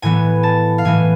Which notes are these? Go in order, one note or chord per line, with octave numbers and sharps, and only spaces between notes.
A2 E3 B3 G#5
A5
F5
A2 E3 B3 G#5